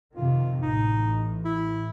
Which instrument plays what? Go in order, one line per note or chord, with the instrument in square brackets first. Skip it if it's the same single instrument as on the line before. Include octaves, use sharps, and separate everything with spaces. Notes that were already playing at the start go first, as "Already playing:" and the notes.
[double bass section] F2 C3 D#3 [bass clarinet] F4
[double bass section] A1 A2 [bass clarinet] D#4
[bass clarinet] E4